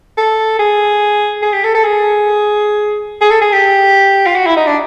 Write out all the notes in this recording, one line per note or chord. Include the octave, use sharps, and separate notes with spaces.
A4
G#4
G#4
G4
A4
A4
G#4
G#4
A4
G#4
G4
F4
F#4
E4
D#4
D4